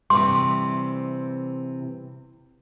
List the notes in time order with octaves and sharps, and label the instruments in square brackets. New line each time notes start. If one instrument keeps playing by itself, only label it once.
[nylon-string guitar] C3 E3 G3 [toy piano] C6